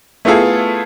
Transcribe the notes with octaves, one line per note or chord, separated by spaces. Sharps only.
A3 B3 E4 F4 G#4 A4